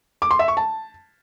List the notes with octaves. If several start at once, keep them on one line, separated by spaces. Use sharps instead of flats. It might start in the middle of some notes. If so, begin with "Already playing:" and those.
D6
C6
E5
C#6
A5